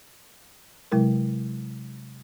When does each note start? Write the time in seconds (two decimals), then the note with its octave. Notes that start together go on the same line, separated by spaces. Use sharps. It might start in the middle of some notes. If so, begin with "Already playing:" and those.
0.92 C3 F#3 G#3 E4 A#4